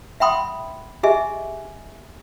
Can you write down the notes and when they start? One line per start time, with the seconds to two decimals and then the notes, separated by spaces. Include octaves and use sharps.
0.20 E5 F#5 G5 B5 C6 D#6
1.03 G4 G#4 D#5 E5 G#5